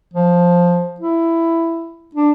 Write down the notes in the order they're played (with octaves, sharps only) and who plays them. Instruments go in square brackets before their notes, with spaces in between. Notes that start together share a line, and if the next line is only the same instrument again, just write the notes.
[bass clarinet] F3
E4
D4